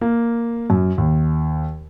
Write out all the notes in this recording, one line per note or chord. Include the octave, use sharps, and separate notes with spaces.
A#3
F#2
D#2